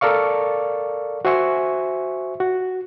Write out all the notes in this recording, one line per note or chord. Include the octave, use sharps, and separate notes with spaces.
A4 A#4 D5 F5 C#6
F#4 C5 E5 G#5 C#6
F#4